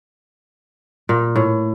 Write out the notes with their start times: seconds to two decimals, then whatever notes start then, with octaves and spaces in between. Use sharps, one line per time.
1.09 A#2
1.36 A2